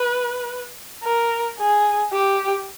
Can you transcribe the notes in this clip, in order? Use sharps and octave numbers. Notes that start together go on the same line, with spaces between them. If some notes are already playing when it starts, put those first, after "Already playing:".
Already playing: B4
A#4
G#4
G4